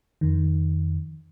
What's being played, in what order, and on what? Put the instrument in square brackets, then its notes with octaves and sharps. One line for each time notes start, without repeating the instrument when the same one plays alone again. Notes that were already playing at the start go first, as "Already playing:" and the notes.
[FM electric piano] F2 D#3